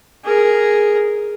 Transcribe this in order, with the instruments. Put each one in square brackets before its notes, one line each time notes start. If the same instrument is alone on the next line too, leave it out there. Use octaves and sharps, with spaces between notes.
[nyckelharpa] G#4 A#4